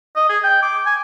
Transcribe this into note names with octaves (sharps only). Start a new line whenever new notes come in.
D#5
G#4
G5
D6
G#5